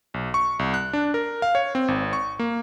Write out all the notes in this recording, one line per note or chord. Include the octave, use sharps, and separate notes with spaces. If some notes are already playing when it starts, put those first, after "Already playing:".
B1
C#6
C2
F#6
D4
A#4
F5
C#5
C4
G#1
C#6
A#3